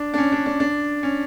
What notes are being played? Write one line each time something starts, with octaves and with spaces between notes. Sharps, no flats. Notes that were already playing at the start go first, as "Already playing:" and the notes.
Already playing: D4
D4
C#4
D4
D4
D4
C#4